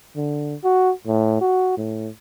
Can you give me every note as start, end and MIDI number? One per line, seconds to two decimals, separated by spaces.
0.16 0.55 50
0.64 0.91 66
1.07 1.38 45
1.41 1.76 66
1.77 2.08 45